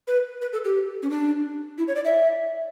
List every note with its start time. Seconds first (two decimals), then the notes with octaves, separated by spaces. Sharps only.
0.08 B4
0.42 B4
0.53 A4
0.65 G4
1.03 C#4
1.10 D4
1.78 E4
1.88 C#5
1.96 D5
2.05 E5